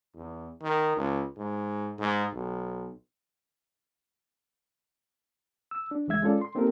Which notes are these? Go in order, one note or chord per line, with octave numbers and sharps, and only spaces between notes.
E2
D#3
C#2
G#2
G#2
B1
E6
D4
C#2 E3 G#3 E5 G#6
G#3 C#4 F4 A4 D5
C6
A#3 C4 D#4 G4 A4 A#4